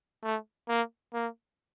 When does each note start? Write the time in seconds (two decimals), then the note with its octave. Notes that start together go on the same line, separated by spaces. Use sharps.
0.23 A3
0.68 A#3
1.14 A#3